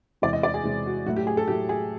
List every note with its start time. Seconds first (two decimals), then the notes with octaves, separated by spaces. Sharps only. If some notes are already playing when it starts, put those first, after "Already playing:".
0.22 E2 C3 E3 G#3 D5
0.33 D#5
0.43 D5
0.54 G#4
0.64 E2 C3 E3 G#3
0.86 F#4
1.06 A2 F#3 A3 F#4
1.16 G4
1.27 G#4
1.37 A4
1.48 A2 F#3 A3 G4
1.69 G#4